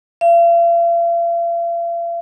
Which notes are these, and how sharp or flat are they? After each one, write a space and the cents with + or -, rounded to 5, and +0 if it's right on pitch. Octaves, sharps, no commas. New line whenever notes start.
F5 -45